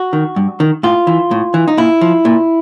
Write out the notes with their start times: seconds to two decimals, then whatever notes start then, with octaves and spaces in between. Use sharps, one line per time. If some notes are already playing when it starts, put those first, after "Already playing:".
Already playing: F#4
0.13 D#3
0.36 G2
0.60 D#3
0.83 A2 F4
1.07 E3
1.31 A2
1.54 E3
1.68 D#4
1.77 A#2 E4
2.01 F3
2.25 A#2